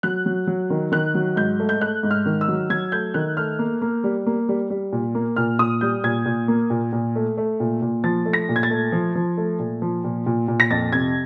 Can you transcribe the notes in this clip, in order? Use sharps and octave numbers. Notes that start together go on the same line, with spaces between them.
F#3 F#6
F#3
F#3
D#3
D#3 F#6
F#3
G#2 G6
A3
G6
A3 F#6
G#2
F6
D#3
E6
F#3
F#3 G#6
A3 G6
D#3 F#6
A3 F6
A#3
A#3
G3
A#3
G3
G3
A#2
A#3
A#2 F6
A#2 D#6
G3 G6
A#2 G#6
A#2
A#3
A#2
A#2
A3
A3
A#2
A#2
F3 A6
A3
A#6
A#2
G#6
A6
A3
F3
F3
A3
A#2
F3
A#2
A#2
A#2
A#6
F2 A6
C3 G#6